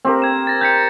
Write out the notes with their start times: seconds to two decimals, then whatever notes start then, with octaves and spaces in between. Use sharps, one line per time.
0.05 C4 G4 A#4
0.22 G#6 E7
0.47 A6 A#6
0.61 A#5 G6 B6 C#7